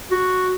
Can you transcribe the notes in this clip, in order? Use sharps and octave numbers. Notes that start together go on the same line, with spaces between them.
F#4